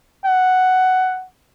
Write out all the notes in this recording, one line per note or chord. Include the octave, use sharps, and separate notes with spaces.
F#5